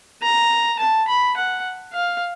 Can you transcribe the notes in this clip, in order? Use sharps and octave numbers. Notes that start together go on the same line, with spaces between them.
A#5
A5
B5
F#5
F5